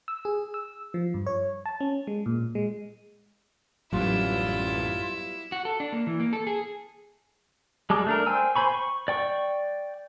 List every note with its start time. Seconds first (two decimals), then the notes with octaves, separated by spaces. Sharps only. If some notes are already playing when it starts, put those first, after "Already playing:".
0.08 E6
0.25 G#4
0.54 E6
0.94 F3
1.14 G2
1.27 C#5
1.66 A5
1.81 C#4
2.07 G#3
2.26 A#2
2.55 G#3
3.93 A1 F#2 F#3 G3 B3 E4 F4 E5
5.52 F#4
5.65 A4
5.80 D4
5.92 A#3
6.07 E3
6.20 A#3
6.33 A4
6.47 G#4
7.90 G3 G#3 A5 D6
8.06 A3 D4 A#4
8.26 C5 G5 G#5 E6
8.56 C5 G#5 B5 C#6
8.72 C#6
9.08 D5 G5 C#6